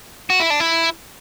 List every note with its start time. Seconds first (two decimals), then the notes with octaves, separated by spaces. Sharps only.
0.30 F#4
0.40 E4
0.50 D4
0.60 E4